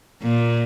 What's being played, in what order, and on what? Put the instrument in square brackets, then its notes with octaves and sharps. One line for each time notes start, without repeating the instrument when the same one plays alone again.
[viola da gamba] A#2